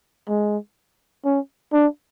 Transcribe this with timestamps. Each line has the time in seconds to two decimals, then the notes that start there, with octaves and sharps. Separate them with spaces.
0.29 G#3
1.25 C#4
1.72 D4